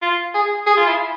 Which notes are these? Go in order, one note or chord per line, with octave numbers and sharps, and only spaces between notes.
F4
G#4
G#4
F4
E4